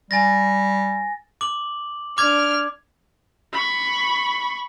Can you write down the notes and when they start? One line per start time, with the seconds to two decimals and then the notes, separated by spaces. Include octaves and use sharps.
0.11 G3 G#5 A6 A#6
1.41 D6 F#7
2.18 D4 D6 F6 G#6
3.53 B5 C#6